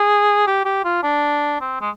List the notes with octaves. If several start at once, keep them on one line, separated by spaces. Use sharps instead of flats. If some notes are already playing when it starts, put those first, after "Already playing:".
Already playing: G#4
G4
G4
F4
D4
C4
G#3